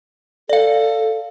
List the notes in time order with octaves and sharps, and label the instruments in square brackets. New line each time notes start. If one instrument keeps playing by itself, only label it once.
[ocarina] A4 [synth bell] D5 F5